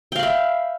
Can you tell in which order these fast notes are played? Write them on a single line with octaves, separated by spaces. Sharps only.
G5 F5 B5 E5